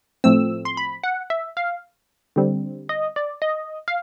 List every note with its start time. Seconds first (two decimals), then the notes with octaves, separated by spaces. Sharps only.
0.24 A2 F3 A3 C4 E6
0.65 C6
0.77 B5
1.04 F#5
1.30 E5
1.57 F5
2.36 D3 G3 C4
2.89 D#5
3.16 D5
3.42 D#5
3.88 F5